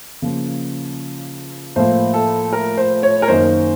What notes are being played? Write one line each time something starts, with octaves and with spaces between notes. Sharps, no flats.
C#3 F3 A#3
A2 F3 A#3 F4 C5
A4
A#4
C5
C#5
A#4
F#2 D#3 A#3 D#4 C5